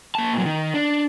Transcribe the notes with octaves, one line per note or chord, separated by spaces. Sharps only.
A#3 A5
A#2 F#3
D#3
D4